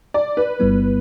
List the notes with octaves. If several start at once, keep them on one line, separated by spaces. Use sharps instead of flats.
D5
B4
G1 G2 G3 B3 E4